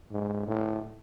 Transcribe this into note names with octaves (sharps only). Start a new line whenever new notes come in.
G#2
A2